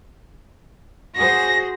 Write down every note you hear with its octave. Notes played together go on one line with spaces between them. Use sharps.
F#4 G#4 C5 A#6